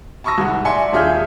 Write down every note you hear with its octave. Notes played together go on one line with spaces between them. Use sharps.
A5 B5 C#6 D#6 E6 A#6
C2 G#2 F#5
D5 E5 G#5 C6 C#7
D#1 F4 G#4 E5 F6 G6